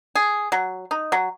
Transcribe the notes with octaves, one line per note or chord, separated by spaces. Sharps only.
G#4
F#3
D#4
F#3